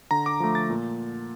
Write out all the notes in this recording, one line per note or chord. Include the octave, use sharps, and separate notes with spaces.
D3 A#5
D6
F3 A3
A6
A#2